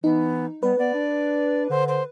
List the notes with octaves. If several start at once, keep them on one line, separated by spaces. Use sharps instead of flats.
E3 B3 D#4
G3 B3 B4
B3 D5
D4
D3 C5
C5